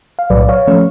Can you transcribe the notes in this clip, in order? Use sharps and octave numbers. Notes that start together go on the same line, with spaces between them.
F5
B1 A2 F#3 B4 D5
D5
C#5 F5
F3 A3 C#4